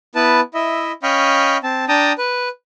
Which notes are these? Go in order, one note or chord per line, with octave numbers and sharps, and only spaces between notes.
B3 E4 B4 A5
E4 D#5 E5
C#4 D#5 F5 G5 B5 C#6
C4 A5
D4 G5 A5 A#5 D#6
B4